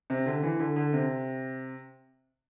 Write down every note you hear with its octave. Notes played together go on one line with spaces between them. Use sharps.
C3
D3
E3
D3
D3
C3